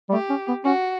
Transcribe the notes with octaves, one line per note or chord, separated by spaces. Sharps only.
G3
A3 G4
C#4
B3
C#4 F#4